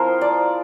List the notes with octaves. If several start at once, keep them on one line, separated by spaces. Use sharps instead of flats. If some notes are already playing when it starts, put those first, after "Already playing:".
Already playing: F3 C4 E4 A#4 C5
D5